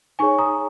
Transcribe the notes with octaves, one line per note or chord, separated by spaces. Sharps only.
D#4 G#4 C#5 G#5 C#6
A#5 D#6